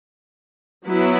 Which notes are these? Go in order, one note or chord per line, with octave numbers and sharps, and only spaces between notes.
F#3 B3 E4